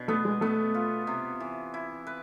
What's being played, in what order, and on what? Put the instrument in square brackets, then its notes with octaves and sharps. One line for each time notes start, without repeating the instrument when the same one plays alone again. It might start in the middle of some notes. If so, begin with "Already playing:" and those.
Already playing: [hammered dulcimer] B2 D4
[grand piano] A3 [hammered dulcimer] B3
[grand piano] G#3
[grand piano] A3 [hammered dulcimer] B3
[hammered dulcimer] F4
C3
E3
E4
B4